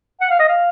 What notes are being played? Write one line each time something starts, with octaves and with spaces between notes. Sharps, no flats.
F#5
F5
D#5
F5